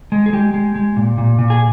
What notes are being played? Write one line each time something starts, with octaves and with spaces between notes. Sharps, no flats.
G#3
G#4
G#3 G4
G#3
G#3
A#2
A#2
A#2
G#4